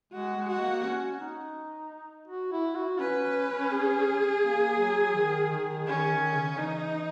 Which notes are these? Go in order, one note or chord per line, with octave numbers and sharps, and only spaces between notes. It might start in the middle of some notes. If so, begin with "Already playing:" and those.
G#3 F#4
G#3
F#4
A#3
C#4
D#4
F#4
E4
F#4
C#4 B4
G#4
A#3
F#3
D#3
D#3
D#3 C#4
D#3
C#3
E3 D#4